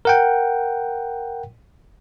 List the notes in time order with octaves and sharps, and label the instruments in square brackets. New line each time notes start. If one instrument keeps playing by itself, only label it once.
[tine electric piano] A#4 F#5 G5